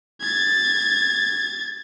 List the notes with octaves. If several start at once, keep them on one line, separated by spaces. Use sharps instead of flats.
G#6 A6